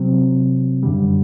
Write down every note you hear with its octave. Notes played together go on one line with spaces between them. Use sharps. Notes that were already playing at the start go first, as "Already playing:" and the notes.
Already playing: C3 F#3 C4
F#2 D3 G3